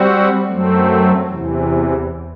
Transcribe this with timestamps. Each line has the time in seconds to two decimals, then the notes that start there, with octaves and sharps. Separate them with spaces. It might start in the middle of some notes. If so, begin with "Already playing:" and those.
Already playing: G3 C4 F#4
0.45 F#2 F#3 A3 C4
1.28 E2 C3 E3